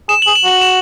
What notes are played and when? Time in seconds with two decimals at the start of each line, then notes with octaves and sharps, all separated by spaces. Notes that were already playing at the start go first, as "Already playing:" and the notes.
0.09 G#4 E7
0.22 G#4 F#7
0.36 E7
0.44 F#4 F#7
0.61 E7